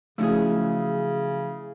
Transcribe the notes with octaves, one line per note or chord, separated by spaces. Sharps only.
C#3 F3 F#3 A3 C#4 E4 G#4